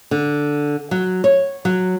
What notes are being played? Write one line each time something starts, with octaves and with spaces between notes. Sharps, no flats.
D3
F#3
C#5
F#3